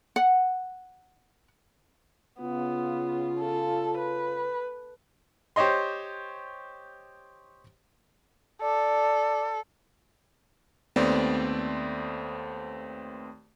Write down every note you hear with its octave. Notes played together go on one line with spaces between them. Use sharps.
F#5
C#3 B3 F4
A4
B4
G4 C5 C#5 D#5 C6
A4 D5
D#2 A3 B3 C4 D5